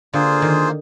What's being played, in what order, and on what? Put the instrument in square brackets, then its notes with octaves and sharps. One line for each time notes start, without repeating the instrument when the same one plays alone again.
[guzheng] D3 [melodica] A#3 F4 G#4 C5
[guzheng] D#3